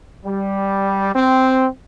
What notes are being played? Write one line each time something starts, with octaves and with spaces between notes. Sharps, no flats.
G3
C4